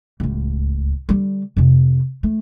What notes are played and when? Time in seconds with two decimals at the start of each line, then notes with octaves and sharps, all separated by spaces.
0.20 D1 C#2
1.09 D3 G3
1.57 F2 C3
2.23 A3